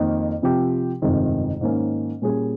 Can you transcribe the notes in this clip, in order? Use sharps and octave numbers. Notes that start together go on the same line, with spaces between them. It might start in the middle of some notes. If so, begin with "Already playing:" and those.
Already playing: F2 D#3 A#3
C3 F3 C4 G4
G1 F2 C3 D#3 G#3
G#2 D#3 A#3 C#4
A#2 G3 C#4 G#4